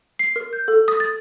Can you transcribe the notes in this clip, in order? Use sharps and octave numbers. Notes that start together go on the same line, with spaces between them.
C7
A#4
G6
A4
D#6
A6